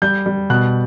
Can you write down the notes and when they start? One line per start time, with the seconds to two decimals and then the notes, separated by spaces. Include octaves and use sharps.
0.02 G3 G6
0.26 G3
0.50 B2 F#6